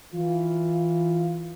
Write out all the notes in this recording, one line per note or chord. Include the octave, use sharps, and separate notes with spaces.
E3 F4